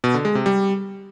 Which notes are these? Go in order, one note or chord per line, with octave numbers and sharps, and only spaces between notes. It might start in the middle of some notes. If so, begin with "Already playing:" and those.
B2
D3
G#3
C3
G3